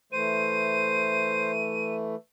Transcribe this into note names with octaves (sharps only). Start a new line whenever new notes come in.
E3 A3 C5 D#7